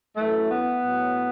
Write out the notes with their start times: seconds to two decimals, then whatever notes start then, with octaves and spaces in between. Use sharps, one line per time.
0.16 F#2 E3 A3
0.49 B3
0.83 A2 F#3